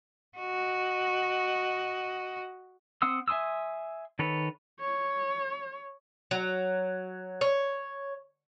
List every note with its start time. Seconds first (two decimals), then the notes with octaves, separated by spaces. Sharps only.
0.38 F#4 D#5
3.02 C4 F#5 C6 D#6 E6
3.28 E5 G#5 C6 D#6 E6
4.19 D#3 A4 B4 C#5
4.80 C#5
6.31 F#3
7.41 C#5